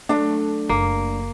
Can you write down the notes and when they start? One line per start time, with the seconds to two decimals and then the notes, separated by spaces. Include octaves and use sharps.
0.09 F#3 A3 D4
0.69 F#1 A#3